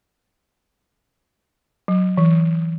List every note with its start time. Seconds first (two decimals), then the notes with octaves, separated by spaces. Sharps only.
1.88 F#3
2.17 E3